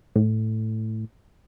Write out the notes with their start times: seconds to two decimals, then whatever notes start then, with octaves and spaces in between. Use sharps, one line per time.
0.16 A2